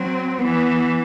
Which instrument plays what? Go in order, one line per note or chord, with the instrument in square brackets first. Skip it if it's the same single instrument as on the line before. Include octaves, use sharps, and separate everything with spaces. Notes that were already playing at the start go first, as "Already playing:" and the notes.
Already playing: [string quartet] F#3 [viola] C4
[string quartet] E3 [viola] B3